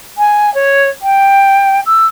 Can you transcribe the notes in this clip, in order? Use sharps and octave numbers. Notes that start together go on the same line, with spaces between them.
G#5
C#5
G5
E6